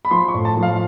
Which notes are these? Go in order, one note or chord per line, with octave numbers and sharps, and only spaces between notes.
B5
F3 C6
C#6
A2
A5
F3
F5